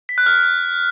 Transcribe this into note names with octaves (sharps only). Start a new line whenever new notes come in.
B6
F#6
F6